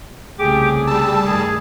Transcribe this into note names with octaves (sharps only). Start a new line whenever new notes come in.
C2 C#3 A3 G4 G#4 D6
G3 A5 E6
G2 D#3 A3 G#4